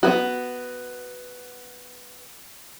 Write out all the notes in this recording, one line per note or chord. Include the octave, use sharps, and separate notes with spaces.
B3 F#4